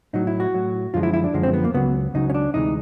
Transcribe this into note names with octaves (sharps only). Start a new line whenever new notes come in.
A2 F#3 D#4
E4
F#4
A2 F#3
F#2 D3 F3 G#3 F4
E4
E4
D4
F#2 D3 F3 G#3
C4
B3
A#3
C#2 C#3 F#3 B3
C#2 C#3 F#3 D#4
C#4
D4
D2 C3 E3 G#3 D#4